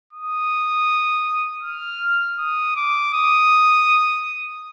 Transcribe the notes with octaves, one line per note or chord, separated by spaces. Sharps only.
D#6
F6
D#6
D6
D#6